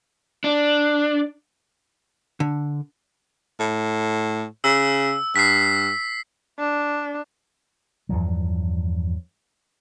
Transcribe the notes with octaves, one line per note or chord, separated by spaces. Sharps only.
D4
D3
A2
C#3 E6
G2 B6 C7
D4
E2 G2 F3 F#3